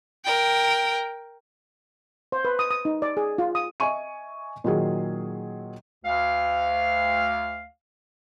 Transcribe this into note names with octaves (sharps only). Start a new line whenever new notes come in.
A#4 G5
C5
B4
D#6
D#6
D#4
D5
G#4
F4
D#6
D#5 E5 G#5 C#6 D#7
A#2 D#3 F#3 G#4
D2 F5